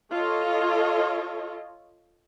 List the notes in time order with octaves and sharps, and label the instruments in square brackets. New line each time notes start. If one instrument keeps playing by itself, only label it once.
[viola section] F4 A4 C#5 D#5